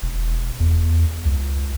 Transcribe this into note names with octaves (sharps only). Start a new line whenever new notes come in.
E1
E2
C#2